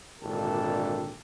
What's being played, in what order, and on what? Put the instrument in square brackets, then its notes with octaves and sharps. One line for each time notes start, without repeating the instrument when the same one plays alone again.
[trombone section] G#1 A#2 D3 D4 G4 A4